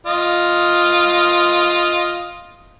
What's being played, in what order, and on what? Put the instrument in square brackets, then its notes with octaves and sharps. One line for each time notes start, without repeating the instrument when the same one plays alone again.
[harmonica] F4 D#5